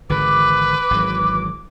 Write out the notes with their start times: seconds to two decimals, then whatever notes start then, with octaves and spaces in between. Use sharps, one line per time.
0.09 G#1 D3 E3 B4 D6
0.91 G#1 E3 F#3